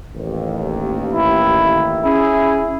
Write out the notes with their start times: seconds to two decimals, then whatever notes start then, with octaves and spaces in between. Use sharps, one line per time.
0.15 A1 D#2
1.13 E4
2.04 C#4 E4 G#4